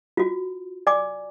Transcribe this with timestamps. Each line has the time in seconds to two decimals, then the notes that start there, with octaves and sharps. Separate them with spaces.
0.17 F4 F#4
0.87 D5 G#5 D6